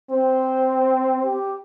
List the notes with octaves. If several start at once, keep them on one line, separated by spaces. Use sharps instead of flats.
C4 C5
G4